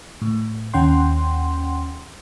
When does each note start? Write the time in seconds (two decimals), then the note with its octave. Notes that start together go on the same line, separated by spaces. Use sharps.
0.22 A2
0.74 D#2 C#4 F#5 G5 C6